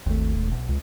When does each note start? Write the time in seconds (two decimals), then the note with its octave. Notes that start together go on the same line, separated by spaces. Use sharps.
0.06 G#1 D#2 A3
0.35 E1
0.52 B1
0.69 C#2